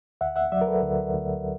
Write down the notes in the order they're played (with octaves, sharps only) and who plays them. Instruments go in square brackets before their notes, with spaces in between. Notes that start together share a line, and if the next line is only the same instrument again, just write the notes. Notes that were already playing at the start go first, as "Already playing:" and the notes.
[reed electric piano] D2 E5 F#5
E5 F#5
F#3 D5 E5
A#4
A4 B4
D2
D2